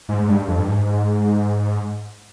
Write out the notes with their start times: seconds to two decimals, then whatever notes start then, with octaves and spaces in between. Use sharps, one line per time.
0.09 G#2
0.23 G#2
0.29 G2
0.48 F2
0.59 G2
0.68 G#2